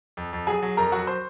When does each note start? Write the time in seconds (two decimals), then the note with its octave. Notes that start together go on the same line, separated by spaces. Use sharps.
0.17 F2
0.33 F2
0.47 F#3 G#4 G#5
0.62 F#3
0.77 F2 A#4 A#5
0.92 F#3 F#4 F#5
1.07 C5 C6